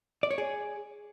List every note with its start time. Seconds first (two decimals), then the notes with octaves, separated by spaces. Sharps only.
0.23 D5
0.31 C#5
0.38 G#4